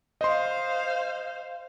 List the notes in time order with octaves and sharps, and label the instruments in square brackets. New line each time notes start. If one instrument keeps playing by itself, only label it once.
[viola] C5 F5 [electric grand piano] D#5 C6